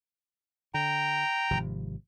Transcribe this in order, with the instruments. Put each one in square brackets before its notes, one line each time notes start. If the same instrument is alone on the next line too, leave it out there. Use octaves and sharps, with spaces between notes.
[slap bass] D3 [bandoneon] G5 A#5
[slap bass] G#1 C3 F3